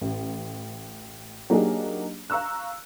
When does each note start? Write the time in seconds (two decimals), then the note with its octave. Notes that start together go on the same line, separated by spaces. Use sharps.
0.01 A1
1.50 F#3 A#3 D4 D#4 G4 G#4
2.30 F5 A#5 C#6 E6 F#6